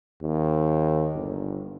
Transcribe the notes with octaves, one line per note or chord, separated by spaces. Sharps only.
D#2
G1